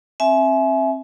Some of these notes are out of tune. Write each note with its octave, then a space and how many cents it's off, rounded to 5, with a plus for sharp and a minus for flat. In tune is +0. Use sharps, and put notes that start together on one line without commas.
C4 +25 E5 +0 G#5 +30